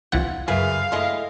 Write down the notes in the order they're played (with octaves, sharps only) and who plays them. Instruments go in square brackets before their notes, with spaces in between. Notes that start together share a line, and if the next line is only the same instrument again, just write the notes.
[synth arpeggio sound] C2 E3 F#5 [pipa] F4
[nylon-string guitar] F#2 C#3 E5 [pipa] G#4 B4 [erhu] F5
[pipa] G#3 D#5 C6 [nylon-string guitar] A3 E4